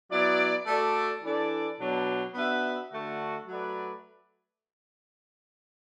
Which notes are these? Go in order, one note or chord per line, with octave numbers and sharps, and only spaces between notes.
F#3 B3 E4 D5
A3 F#4 A4 D5
E3 D4 A4 D5
B2 F#3 D4
B3 D4 F#4 B4 E5
D3 A3 F#4
F#3 A3 F#4 B4 D5